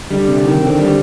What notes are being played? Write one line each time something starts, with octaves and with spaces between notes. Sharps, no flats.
D3 G3
C3
D#3
D3 C4
G3